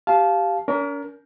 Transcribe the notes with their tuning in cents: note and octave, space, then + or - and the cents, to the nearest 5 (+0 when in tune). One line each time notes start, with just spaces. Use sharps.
G4 +0 F5 +0 A5 -25
C#4 +45 A#4 +0